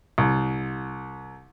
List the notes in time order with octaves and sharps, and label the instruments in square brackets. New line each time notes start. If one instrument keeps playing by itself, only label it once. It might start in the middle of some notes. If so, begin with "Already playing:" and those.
[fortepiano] C2